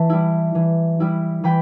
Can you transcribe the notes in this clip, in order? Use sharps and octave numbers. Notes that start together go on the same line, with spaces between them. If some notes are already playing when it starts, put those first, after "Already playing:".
Already playing: E3 E5 A5
G3 E4
E3
G3 E4
E3 G5 B5